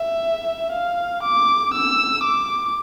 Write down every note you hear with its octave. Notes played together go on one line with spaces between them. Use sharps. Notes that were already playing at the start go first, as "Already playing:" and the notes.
Already playing: E5
F5
D6
E6
D6